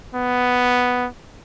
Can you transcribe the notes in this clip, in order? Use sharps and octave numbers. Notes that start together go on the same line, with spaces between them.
B3